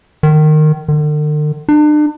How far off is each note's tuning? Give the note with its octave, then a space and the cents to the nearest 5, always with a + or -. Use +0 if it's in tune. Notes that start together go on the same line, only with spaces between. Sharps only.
D#3 -20
D3 +45
D4 +40